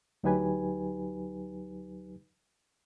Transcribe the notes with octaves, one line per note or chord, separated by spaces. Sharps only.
D2 F#3 D#4 G4 B4 G#5